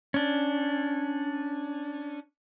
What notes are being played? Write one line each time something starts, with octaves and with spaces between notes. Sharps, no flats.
C#4 D4